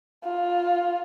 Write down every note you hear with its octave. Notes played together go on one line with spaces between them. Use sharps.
F4